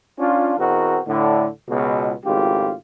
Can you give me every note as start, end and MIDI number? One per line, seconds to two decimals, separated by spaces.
0.19 0.57 61
0.19 0.57 62
0.19 0.57 65
0.58 0.99 40
0.58 0.99 47
0.58 0.99 60
0.58 0.99 66
0.58 0.99 70
1.07 1.46 45
1.07 1.46 50
1.69 2.12 37
1.69 2.12 47
2.24 2.72 32
2.24 2.72 37
2.24 2.72 45
2.24 2.72 65
2.24 2.72 67